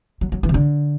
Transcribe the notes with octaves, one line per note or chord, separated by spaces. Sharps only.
F#3
F#3
E3
C3
D3